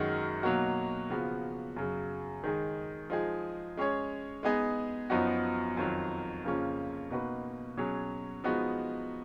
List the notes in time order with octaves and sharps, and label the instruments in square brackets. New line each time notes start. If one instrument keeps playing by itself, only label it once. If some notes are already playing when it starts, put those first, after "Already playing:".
Already playing: [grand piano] F#2 D#3 G#3 D#4 F#4
B2 F#3 A#3 D#4 F#4
C#3 F3 B3 F#4
F#2 C#3 F#3
D#3 G#3 D#4 G#4
F3 G#3 D#4 G#4
G#3 C#4 G#4 C#5
G#3 B3 D#4 G#4 D#5
F#2 F3 B3 D#4 F#4
F2 D#3 F#3
F2 C#3 F3 A#3 C#4
B2 A#3 D#4 F#4 B4
B2 F#3 C#4 G#4
F3 G#3 B3 D#4 F#4